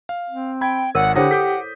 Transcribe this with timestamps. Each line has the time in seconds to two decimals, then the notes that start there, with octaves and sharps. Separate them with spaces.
0.09 F5
0.30 C4
0.61 G5 B5 G#6
0.95 G#1 A#4 C#5 F#5
1.16 D3 E4 G4 C5 C#5 F#5 D#6 A#6
1.31 A4 D6 G6 B6